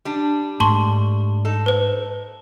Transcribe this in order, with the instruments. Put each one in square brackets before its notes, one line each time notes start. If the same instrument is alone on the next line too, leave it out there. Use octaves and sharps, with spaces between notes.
[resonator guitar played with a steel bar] G3 D4
[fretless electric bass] G#2 A3 [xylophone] A5 C6 C#6
[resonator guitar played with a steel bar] D#4 A4
[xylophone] B4 C5